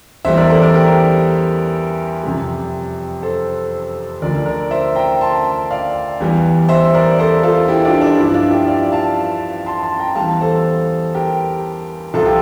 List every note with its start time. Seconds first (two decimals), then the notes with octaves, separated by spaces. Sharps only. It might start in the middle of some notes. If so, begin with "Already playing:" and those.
0.25 E2 E3 G3 C5 E5
0.37 A#4 D5
0.49 A4 C5
0.62 A#4 D5
0.74 G4 A#4
2.23 F2 C3 G3
3.22 A4 C5
4.22 D2 D3 F3 A#4 D5
4.46 A#4 D5
4.71 C5 E5
4.95 G5 A#5
5.21 A5 C6
5.71 D5 F5
6.20 E2 E3 G3
6.69 C5 E5
6.94 A#4 D5
7.19 A4 C5
7.43 F4 A4
7.68 E4 G4
7.85 D4 F4
8.01 D4
8.17 G2 F3 E4
8.34 D4 F4
8.51 E4 G4
8.67 D5 F5
8.92 F5 A5
9.66 A5 C6
9.83 A5 C6
10.00 G5 A#5
10.15 E2 E3 G3 F5 A5
10.41 A4 C5
11.14 G4 A#4
12.14 C2 C3 F3 F4 A4
12.26 G4